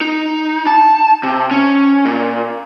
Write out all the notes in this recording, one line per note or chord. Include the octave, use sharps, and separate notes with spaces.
D#4
A5
C3
C#4
A#2